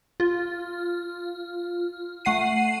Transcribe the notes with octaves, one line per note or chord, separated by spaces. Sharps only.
F4
A3 F#5 C7 D#7